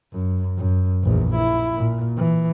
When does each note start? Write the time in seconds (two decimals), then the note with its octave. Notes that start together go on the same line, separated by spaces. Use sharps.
0.12 F#2
0.57 F#2
1.03 A#1 E2
1.35 E4
1.76 A#2
2.17 E3